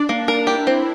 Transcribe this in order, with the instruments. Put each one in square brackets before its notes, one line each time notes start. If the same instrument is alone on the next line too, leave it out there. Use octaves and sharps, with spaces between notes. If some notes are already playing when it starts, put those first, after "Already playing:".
Already playing: [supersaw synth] D4 [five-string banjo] D5
[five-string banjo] A#3
A#4
[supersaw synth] E4 [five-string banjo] G4
[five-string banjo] C4